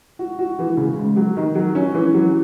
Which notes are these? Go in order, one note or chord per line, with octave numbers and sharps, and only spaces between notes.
F#4
F#4
E3
C#3
G#2
F#3
D#3
F#3
C#4
E3
F#3